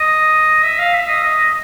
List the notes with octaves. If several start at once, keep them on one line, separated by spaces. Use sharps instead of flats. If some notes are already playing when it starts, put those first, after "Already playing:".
Already playing: D#5
E5
F5
E5
D#5
D#5